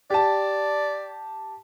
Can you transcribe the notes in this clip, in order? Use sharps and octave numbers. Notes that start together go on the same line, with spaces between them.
G4 D5 A5